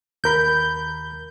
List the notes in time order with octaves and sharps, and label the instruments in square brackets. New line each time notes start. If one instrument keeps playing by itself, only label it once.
[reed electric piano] D#2 A#4 B5 [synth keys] G6